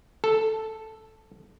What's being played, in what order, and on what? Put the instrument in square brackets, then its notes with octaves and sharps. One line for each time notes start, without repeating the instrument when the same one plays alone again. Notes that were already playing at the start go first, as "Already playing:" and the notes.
[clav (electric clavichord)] A4